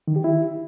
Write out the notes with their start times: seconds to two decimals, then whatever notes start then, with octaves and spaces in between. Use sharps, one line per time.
0.07 D#3
0.16 G4
0.24 E4